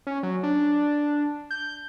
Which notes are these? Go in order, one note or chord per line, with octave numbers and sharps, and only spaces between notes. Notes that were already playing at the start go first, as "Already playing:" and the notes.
C#4
F#3
D4
G6